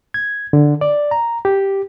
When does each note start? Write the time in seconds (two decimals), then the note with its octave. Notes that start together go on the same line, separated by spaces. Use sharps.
0.14 G#6
0.53 D3
0.81 D5
1.11 A#5
1.45 G4